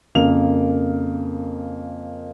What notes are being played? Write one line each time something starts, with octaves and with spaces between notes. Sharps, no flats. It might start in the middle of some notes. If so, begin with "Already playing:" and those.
F2 C#3 A#3 A#4 F7